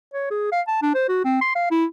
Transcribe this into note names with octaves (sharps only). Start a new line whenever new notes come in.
C#5
G#4
F5
A5
D4
C5
F#4
C4
C6
F5
E4